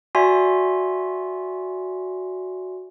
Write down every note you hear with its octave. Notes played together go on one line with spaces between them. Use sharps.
F#4 D5 E5 G#5 C6